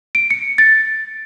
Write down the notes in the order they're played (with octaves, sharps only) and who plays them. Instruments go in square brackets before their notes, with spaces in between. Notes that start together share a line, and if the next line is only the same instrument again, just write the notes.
[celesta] D7
C#7
A6